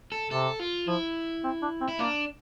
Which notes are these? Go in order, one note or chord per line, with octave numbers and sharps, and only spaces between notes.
A4
C3 A4
F4
F3 E4
C4
D4
C4
E4
A#3 D4